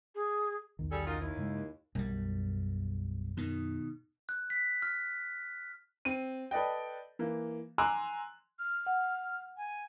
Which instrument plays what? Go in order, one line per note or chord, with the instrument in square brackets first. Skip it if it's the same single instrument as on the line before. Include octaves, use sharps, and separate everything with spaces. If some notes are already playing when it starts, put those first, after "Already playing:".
[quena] G#4
[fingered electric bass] B1 E2 D#3
[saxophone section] G3 G#4 A4
F#2 D#4 F4
D#2 E4
[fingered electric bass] G2 C#3 G#3
[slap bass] B1 G3 [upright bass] F#2
[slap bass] B2 D#3
[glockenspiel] F#6
B6
F6
[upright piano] C4 D#7
A4 B4 D5 D#5 G5
E3 A#3
G#5 A#5 C6 D6 E6 F#6
[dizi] F6
[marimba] F#5
[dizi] G#5